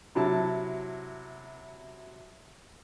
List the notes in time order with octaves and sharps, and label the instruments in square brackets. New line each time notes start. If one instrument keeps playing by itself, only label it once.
[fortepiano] C3 F#3 E4 A5